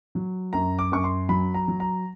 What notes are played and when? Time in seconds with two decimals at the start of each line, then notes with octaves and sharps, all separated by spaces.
0.15 F#3
0.53 F#2 A#5
0.79 D6
0.92 F#2 C#6
1.04 C6
1.29 F#3 B5
1.54 A#5
1.68 F#3
1.80 A#5